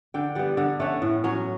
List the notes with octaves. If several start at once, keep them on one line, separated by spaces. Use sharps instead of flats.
D3 G5
G3 B3 F#5
D3 F#5
A3 C#4 F#5
A2
F#3 C#4